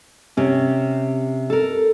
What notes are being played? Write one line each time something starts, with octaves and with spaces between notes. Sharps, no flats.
C3 C#4
A4 A#4